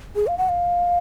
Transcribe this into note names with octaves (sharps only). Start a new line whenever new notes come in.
G#4
F5
F#5
F5